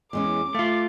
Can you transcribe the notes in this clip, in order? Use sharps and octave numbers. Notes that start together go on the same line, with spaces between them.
E2 G#3 C#4 D6
A3 F4 F5